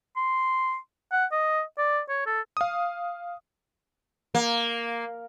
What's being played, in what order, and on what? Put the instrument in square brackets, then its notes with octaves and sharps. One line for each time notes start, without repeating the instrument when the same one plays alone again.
[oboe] C6
F#5
D#5
D5
C#5
A4
[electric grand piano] F5 D#6
[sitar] A#3